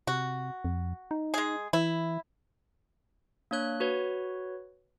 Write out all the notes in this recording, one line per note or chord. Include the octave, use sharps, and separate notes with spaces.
C3 F#4
F2
D#4
G#3 G#4
E3 E4
A#3 D4 C#5 F#6
F#4 B4 C#5